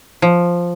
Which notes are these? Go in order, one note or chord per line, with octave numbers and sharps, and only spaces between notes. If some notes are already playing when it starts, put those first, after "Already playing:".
F3